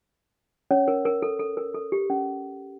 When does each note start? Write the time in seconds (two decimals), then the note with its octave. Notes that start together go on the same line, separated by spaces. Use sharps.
0.71 C#4 C#5
0.88 A#4
1.05 A#4
1.22 A4
1.39 A4
1.57 A#4
1.75 A4
1.92 G4
2.10 C#4